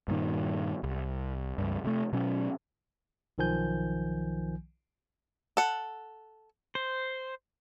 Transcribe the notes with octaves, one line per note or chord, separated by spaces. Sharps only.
G2 A#2 D#3
C2
C#2 G2
C3 A3
B2 F#3 C#4
B1 D#3 F3 G#5 G6
A4 F#5
C5